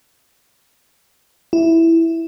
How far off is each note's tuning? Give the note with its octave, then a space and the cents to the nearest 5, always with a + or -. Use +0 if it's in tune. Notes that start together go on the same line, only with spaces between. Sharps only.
E4 +0